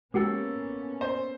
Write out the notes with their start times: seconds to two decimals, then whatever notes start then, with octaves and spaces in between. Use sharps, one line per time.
0.14 G#3 A#3 B3 C#4 F#4 G4 A4
1.01 C5